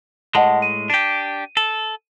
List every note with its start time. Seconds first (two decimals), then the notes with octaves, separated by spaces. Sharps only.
0.35 A2 G#3 D#5 F#5 A5
0.62 D#7
0.90 D4 G4
1.57 A4